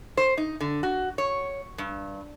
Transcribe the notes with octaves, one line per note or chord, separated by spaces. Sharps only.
C5
D#4
D3
F#4
C#5
G2